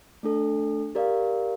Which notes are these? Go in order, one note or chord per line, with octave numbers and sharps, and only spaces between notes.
A3 D4 A4
G4 A#4 D5 F5